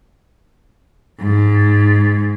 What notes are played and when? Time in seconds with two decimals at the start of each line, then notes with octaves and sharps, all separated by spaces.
1.20 G#2